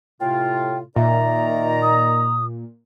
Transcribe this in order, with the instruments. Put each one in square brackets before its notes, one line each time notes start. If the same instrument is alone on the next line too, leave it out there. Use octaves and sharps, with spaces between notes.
[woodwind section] A2 C3 F4 [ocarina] G5
[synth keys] A#2 [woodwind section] D#3 D5 A#5 [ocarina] E5
[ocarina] D#6